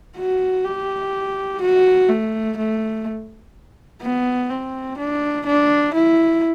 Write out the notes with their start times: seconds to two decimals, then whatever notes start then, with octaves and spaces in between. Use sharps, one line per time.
0.16 F#4
0.65 G4
1.61 F#4
2.09 A3
2.57 A3
4.02 B3
4.50 C4
4.98 D4
5.46 D4
5.94 E4